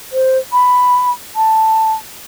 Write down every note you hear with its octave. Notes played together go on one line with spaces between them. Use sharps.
C5
B5
A5